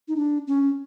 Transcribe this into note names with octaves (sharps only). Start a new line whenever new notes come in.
D#4
D4
C#4